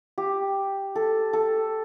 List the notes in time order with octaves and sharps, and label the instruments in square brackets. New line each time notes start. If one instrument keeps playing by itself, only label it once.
[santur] G4
A4
A4